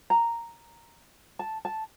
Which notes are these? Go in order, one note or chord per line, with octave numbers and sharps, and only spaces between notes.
A#5
A5
A5